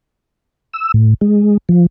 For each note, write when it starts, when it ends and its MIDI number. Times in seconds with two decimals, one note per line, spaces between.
0.73 0.92 88
0.94 1.14 45
1.21 1.57 56
1.69 1.86 53